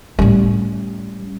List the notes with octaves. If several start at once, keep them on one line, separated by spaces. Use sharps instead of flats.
A2 G3 C#4